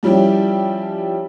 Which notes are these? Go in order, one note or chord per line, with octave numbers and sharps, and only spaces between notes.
F3 G3 C#4 E4 G4